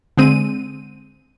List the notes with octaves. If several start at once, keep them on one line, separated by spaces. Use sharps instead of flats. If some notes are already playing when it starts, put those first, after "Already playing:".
D3 G#3 C4 D#7